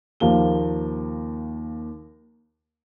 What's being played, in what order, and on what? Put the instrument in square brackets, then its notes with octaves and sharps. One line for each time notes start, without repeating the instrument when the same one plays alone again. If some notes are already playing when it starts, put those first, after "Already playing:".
[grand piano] D#2 F3 A#3 G7